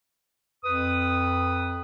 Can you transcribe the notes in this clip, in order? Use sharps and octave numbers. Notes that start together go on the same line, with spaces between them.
F2 B4 D#6